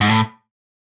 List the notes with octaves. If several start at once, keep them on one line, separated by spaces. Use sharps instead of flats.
G#2
A2